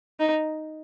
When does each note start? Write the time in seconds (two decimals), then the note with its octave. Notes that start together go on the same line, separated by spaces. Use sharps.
0.20 D#4